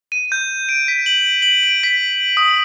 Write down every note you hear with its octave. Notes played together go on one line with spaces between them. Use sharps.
D#7
G6
D7
B6
F#7
F#7
D7
B6
D#6